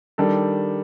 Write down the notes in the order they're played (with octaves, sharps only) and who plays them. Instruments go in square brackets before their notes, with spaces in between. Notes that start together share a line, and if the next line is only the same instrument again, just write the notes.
[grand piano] D#3 G3 D4 A4